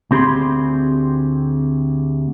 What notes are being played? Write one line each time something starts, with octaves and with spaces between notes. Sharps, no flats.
D2 C4 G4 G#4 B5 C6